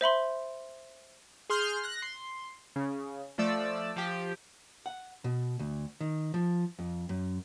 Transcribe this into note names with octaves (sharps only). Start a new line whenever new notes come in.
C5 E5 B5 C6
G#4 C6 F6 G6
F#6 A#6
C6
C#3
F3 A3 D5 E6
F3 G4
F#5
B2
D2
D#3
F3
F2
F#2